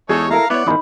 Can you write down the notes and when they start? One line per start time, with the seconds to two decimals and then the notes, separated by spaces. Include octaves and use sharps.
0.09 E2 G#3 D#4 G#4 A4 C#5
0.31 E4 A4 A#4 F5 A#5
0.50 B3 E4 C#5 D5 F#5
0.66 E2 G#2 D#3 D#4 B5